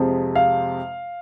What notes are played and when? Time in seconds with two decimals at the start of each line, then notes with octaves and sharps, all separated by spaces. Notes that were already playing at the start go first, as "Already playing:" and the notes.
Already playing: F2 C3 F3 G#3
0.35 F5